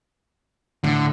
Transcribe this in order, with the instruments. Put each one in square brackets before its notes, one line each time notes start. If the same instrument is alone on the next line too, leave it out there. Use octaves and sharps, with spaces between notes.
[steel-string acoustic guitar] A2 [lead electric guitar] D3